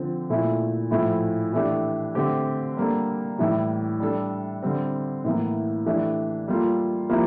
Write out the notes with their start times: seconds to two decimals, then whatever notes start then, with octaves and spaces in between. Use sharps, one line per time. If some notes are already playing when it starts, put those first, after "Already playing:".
Already playing: D3 F3 C4 F4
0.30 A#2 A3 E4
0.91 A2 F3 A3 E4
1.53 E3 A3 D4 G4
2.15 D3 A3 C4 G4
2.77 G3 A#3 D4 A4
3.39 A2 E3 G3
4.00 G3 D4 A4
4.62 D3 G3 C4
5.24 A2 E3 A#3
5.86 E3 A3 D4 G4
6.48 G3 A#3 F4 A4
7.09 F3 A#3 E4 G4